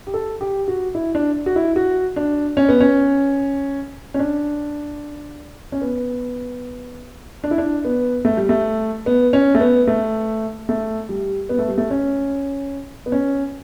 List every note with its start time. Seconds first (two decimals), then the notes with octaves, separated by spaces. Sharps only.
0.07 G4
0.14 A4
0.41 G4
0.68 F#4
0.95 E4
1.15 D4
1.46 F#4
1.56 E4
1.76 F#4
2.16 D4
2.57 C#4
2.69 B3
2.81 C#4
4.14 C#4
4.19 D4
5.72 C#4
5.81 B3
7.44 D4
7.51 E4
7.58 D4
7.85 B3
8.25 A3
8.37 G3
8.49 A3
9.06 B3
9.33 C#4
9.55 A3
9.60 B3
9.87 A3
10.69 A3
11.09 G3
11.49 B3
11.59 A3
11.68 G3
11.78 A3
11.91 C#4
13.06 B3
13.12 C#4